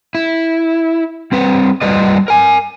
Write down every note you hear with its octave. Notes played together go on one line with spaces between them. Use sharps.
E4
G3 C4 B4
G3 F4 B4 D5 D#5
A#4 G#5